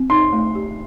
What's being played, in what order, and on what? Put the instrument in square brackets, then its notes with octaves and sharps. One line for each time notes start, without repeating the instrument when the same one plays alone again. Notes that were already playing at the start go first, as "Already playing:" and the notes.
Already playing: [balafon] C4
[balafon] D#4 [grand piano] C6
[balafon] A3
G4